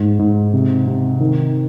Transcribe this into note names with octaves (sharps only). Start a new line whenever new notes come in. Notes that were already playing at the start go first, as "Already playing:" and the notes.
Already playing: G#2
G#2
C3
C3
D#3